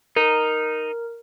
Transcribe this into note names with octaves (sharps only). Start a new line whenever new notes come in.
D#4 A#4